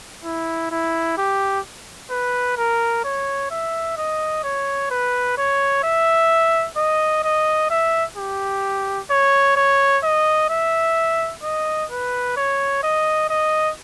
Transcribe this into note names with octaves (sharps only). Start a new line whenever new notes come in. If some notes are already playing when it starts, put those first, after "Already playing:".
E4
E4
G4
B4
A#4
C#5
E5
D#5
C#5
B4
C#5
E5
D#5
D#5
E5
G4
C#5
C#5
D#5
E5
D#5
B4
C#5
D#5
D#5